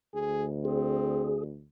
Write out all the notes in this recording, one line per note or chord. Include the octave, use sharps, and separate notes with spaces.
D2 G#4
C4 G#4